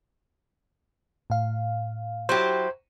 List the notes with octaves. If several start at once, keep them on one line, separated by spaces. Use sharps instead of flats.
A2 F5
F#3 E4 G4 C5